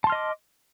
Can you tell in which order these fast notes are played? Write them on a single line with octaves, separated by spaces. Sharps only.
A5 C6 F6 D#5 D6